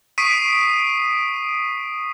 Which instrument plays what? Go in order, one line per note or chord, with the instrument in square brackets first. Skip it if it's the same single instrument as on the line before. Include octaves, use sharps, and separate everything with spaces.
[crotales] C#6 D#6 B6 C7 D7 D#7